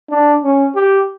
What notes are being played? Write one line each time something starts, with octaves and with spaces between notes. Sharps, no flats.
D4
C#4
G4